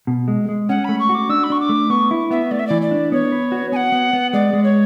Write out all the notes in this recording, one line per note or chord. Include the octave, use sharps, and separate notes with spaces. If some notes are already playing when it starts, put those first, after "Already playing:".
B2
G#3
G#3
C#4 F#5
A3 B5
C#6
F#4 D6
D4 E6
B5
D4 C#6
D6
A3
B3 C#6
E4
B3 E5
A3 D5
E5
E3 D5
D5
D4
B3 C#5
B4
F#4
B3 F#5 G#5
B3
B3
G#3 D5
G#3
C#5